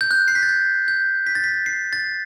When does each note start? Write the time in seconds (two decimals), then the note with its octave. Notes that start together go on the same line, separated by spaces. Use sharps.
0.01 G6
0.11 F#6
0.28 C7
0.35 B6
0.43 A6
0.49 G6
0.88 G6
1.27 B6
1.35 A6
1.44 B6
1.66 C7
1.93 A6